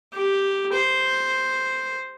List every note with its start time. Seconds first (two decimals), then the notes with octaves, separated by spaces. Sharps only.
0.13 G4
0.73 C5